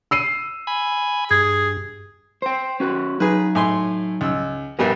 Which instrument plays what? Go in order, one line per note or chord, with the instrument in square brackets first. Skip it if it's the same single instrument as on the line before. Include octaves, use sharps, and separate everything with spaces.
[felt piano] E6 C7 D#7
[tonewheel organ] G#5 B5
[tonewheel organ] G2 [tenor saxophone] G#4 [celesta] G#6
[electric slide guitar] C5 G5
C#4 F#4 B4
[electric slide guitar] F#3 D#4 [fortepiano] G#4 B4
[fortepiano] A2 G#5 C6
C#2 E6
[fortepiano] A#1 G3 B3 [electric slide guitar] A#4 G#5